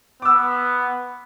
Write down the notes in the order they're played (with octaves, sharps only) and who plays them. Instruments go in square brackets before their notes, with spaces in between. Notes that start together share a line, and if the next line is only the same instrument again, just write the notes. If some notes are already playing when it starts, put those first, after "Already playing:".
[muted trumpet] B3 [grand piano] D6 E6